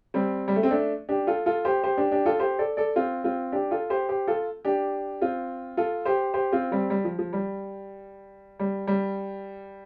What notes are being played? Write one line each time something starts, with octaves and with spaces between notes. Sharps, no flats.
G3 C4
G3
A3
C4
A3 D4
D4 G4
F4 A4
F4 A4
G4 C5
G4 C5
D4 G4
D4 G4
F4 A4
G4 C5
A4 D5
A4 D5
C4 F4
C4 F4
D4 G4
F4 A4
G4 C5
G4 C5
F4 A4
D4 G4
C4 F4
F4 A4
G4 C5
G4 C5
C4 F4
G3 C4
G3
F3
F3
G3
G3
G3